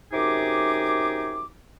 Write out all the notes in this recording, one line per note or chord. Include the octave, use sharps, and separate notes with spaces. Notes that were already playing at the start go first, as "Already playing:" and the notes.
F#2 C3 D#4 G#4 D6